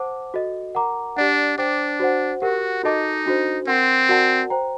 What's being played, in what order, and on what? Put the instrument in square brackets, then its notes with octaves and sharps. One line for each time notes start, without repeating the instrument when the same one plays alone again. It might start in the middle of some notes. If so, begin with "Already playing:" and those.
Already playing: [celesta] C5 F#5 A5 D6
F#4 A4 D#5
A#4 F#5 A#5 D6
[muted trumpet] D4 [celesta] G4 D5 F#5
[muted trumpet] D4 [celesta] C5 G5 D6
[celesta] F#4 C5 F#5
[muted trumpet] F#4 [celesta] G4 A#4 F#5
[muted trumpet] D#4 [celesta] F#4 A4 D#5 A5 D6
[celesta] D4 F#4 A4 C5
[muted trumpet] C4 [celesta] A#4 F#5 C6
[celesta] F#4 A#4 D5 F#5 A5
C5 G5 A#5